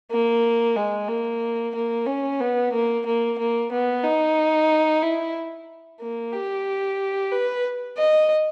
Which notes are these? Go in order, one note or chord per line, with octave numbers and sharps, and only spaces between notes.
A#3
G#3
A#3
A#3
C#4
B3
A#3
A#3
A#3
B3
D#4
E4
A#3
G4
B4
D#5